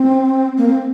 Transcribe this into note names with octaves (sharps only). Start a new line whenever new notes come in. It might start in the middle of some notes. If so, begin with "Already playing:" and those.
Already playing: C4
A#3
C4